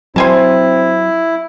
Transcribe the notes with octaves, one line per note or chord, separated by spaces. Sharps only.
F#3 C4 E4 C5 G#5 A5